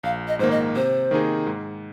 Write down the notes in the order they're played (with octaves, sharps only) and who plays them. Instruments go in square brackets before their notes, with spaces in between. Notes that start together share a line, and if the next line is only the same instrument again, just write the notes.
[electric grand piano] A#1 [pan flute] F5
[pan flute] D#5
[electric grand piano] G#2 D#3 A#3 [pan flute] C5
[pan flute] D#5
[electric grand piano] C3 [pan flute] C5
[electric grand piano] D#3 A#3 D#4 G#4
G#2